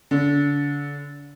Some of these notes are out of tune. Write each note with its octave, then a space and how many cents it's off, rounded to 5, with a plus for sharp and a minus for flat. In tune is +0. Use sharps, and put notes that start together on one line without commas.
D3 -30